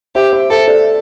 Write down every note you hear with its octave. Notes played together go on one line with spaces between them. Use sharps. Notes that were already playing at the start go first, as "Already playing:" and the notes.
G4 C5 E5
C5 E5
A4 C5 E5
A4 D5